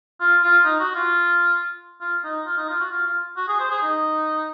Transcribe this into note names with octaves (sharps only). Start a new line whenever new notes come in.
F4
F4
D#4
F#4
F4
F4
D#4
F4
D#4
F4
F#4
F4
F4
F#4
G#4
C5
G#4
D#4